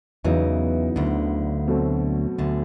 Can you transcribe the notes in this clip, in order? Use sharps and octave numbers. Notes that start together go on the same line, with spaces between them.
E2 C#3 E3 F#3 B3 D#4
D2 D3
B2 F#3 A3 C4
D2 D3